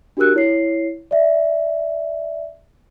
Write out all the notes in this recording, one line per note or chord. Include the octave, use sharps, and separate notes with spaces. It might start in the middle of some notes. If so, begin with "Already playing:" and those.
D4 F#4 G4 A#4 E6 F#6
E4 C#5 C7
D5 E5